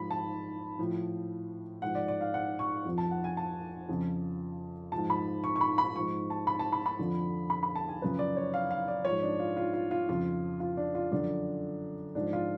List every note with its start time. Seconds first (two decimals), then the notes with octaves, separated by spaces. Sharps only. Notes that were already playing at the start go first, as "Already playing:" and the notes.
Already playing: G#2 F3 B5
0.11 A5
0.79 A2 F3
1.82 G#2 F3 F#5
1.95 D5
2.08 D5
2.21 F5
2.34 F#5
2.59 C#6
2.85 F2 F3
2.98 A5
3.11 F#5
3.24 G#5
3.37 A5
3.89 F2 C#3 F3
4.92 G#2 F3 A5
5.10 B5
5.44 C#6
5.56 C#6
5.61 B5
5.78 B5
5.95 G#2 F3 C#6
6.30 A5
6.47 B5
6.59 A5
6.72 B5
6.86 B5
6.99 F2 D3 F3
7.50 B5
7.63 B5
7.75 A5
7.88 G#5
8.01 F#2 C#3 F3 B4
8.19 D5
8.37 C#5
8.54 F5
8.71 F5
8.88 D5
9.05 G#2 F3 C#5
9.22 D4
9.40 F4
9.57 F4
9.74 F4
9.91 F4
10.09 F2 C#3 F3 F4
10.60 F4
10.77 D4
10.95 F4
11.12 F#2 D3 F3 D4
12.15 G#2 F3 D4
12.33 F4